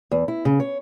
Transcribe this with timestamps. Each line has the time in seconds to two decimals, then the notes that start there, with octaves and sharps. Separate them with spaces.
0.11 E2
0.28 E4
0.45 C#3
0.60 C#5